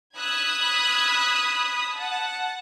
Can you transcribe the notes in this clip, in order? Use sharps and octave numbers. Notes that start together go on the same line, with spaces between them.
B5 D#6 E6 F#6 G#6 B6
F#5 A5